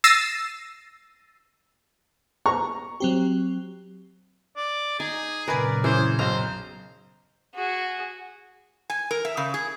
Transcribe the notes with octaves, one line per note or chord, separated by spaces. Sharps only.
E6 A6 A#6 C7 D#7
A#5 C#6
F#3 C4 G4
D5
D#4 G#4 G#5
F#2 A#2 C#3 A#4 B4 D5 G#5 B5
E3 C#4 G#4 C5
B1 C5 A#5
F#4 G#4
G#5
A#4
E5
C#3
G#4